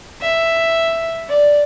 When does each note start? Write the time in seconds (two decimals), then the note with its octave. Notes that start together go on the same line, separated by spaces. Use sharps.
0.21 E5
1.29 D5